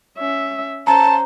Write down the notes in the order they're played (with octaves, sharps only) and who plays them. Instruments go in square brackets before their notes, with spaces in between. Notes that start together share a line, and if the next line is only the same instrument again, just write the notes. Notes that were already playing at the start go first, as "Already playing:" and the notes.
[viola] C#4 E5
[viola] C#4 C5 [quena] A5 [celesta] A#5